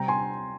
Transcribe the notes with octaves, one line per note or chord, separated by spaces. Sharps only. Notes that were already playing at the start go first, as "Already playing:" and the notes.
Already playing: C3 G3 C4 G5 A#5
G#5 C6